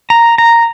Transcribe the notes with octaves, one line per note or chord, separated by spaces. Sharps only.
A#5
A#5